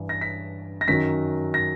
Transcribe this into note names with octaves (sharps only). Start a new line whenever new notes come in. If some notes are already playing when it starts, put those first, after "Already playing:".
Already playing: G2 E3
A#6
B6
A#6
F#2 D#3 F#3 B6
A#6